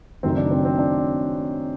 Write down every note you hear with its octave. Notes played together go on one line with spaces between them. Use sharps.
F#1 F#2 D#3 A3 C4
D4
C4
C4
D4